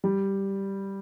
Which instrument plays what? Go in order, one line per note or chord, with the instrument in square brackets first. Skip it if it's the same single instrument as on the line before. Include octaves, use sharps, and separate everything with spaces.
[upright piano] G3